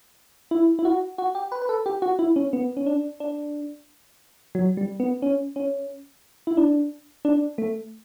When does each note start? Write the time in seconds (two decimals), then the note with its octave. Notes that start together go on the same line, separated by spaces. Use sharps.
0.51 E4
0.79 E4
0.85 F#4
1.18 F#4
1.35 G4
1.52 B4
1.62 B4
1.69 A4
1.86 G4
2.02 F#4
2.19 E4
2.36 C#4
2.53 B3
2.77 C#4
2.86 D4
3.20 D4
4.55 F#3
4.77 G3
5.00 B3
5.22 C#4
5.56 C#4
6.47 E4
6.57 D4
7.25 D4
7.58 A3